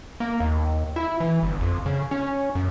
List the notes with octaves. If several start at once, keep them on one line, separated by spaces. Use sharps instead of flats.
A#3
D#2
E4
E3
G1
F2
C#3
C#4
F#2